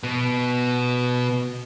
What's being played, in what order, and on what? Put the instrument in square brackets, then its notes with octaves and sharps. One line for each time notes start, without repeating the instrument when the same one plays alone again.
[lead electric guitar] B2 B3